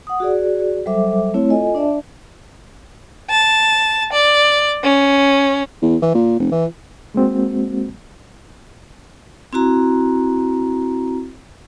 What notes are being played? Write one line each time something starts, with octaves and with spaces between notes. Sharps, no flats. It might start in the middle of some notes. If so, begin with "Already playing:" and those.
F#5 D#6
F#4 G#4 D5
F#3 G3 A4 C5 E5 D6
A3 C4 E4 C#5
F4 A4 D#5 G#5
D4 D5 E5 A5
A5
D5
C#4
E2
E3
A#2
F1
E3
G#3 A#3 C4 F#4
C4 E4 F#4 A#5